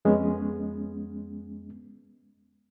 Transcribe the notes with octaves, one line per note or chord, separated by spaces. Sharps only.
F2 G#3 B3 C#4